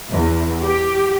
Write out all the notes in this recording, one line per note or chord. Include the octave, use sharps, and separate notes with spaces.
E2
G4